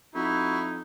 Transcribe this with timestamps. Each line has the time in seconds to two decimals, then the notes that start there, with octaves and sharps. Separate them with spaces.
0.15 F2 D#4 E4 F#4